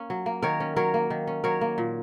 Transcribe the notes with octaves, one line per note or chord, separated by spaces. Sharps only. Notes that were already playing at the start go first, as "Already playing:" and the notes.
Already playing: A#3 C#4
F#3
A#3
D#3 A#4 C#5
C#4
F#3 A#4 C#5
A#3
D#3
C#4
F#3 A#4 C#5
A#3
A#2